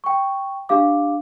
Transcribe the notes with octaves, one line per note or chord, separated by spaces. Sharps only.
G5 C#6
D4 G4 F5 D6